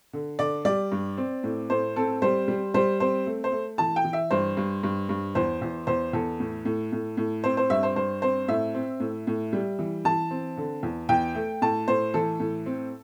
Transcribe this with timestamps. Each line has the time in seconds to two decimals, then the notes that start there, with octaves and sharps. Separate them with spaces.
0.13 D3
0.39 D3 D5
0.65 G3 D5
0.92 G2
1.17 C4
1.44 A2
1.70 A2 C5
1.96 C4 A4
2.22 G3 C5
2.48 G3
2.74 G3 C5
3.00 C4 C5
3.27 A3
3.44 C5
3.52 A3
3.78 E3 A5
3.96 G5
4.04 E3
4.13 E5
4.31 G2 C5
4.57 G2
4.83 G2
5.09 G2
5.35 E2 C5
5.62 E2
5.87 E2 C5
6.13 E2 A4
6.40 A2
6.65 A2
6.92 A2
7.17 A2
7.44 C4 C5
7.57 C5
7.70 G2 E5
7.83 C5
7.96 G2 C5
8.22 C4 C5
8.48 A2 E5
8.74 C4
9.00 A2
9.27 A2
9.53 G3
9.79 E3
10.05 E3 A5
10.31 C4
10.57 D3
10.83 E2
11.09 E2 G5
11.35 A3
11.62 A2 A5
11.88 A2 C5
12.14 E3 A4
12.40 A2
12.66 C4